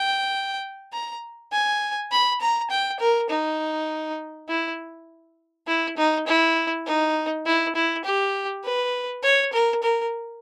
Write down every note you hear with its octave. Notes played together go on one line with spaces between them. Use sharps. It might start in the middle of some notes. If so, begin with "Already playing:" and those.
Already playing: G5
A#5
G#5
B5
A#5
G5
A#4
D#4
E4
E4
D#4
E4
D#4
E4
E4
G4
B4
C#5
A#4
A#4